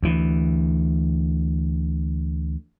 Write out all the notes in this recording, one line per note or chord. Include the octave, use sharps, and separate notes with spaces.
D2 E3